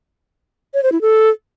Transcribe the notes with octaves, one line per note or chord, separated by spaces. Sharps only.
C#5
C5
E4
A4